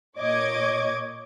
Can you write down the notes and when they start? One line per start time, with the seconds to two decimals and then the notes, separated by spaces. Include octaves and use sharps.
0.18 A#2 C#5 D#5 D6 G#6